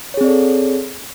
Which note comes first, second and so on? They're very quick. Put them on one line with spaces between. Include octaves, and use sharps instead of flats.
C#5 G#4 C4 D5 A4